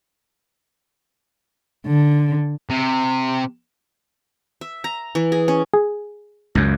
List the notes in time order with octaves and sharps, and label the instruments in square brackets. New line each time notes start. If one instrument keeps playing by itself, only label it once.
[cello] D3
[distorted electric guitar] C3
[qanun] E5
A#5
E3
G#4
C#4
[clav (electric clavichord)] G#4
[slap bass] C#2 F#2